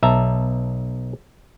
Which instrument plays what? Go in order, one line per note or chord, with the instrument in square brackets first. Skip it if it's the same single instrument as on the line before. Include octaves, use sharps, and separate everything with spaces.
[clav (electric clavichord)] B1 E5 A5 A#5